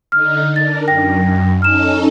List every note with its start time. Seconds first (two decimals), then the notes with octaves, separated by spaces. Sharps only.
0.12 D3 D#4 F6
0.56 D4 A#4 A6
0.88 F#2 G5 A#6
1.62 C#4 D#4 A4 F6 E7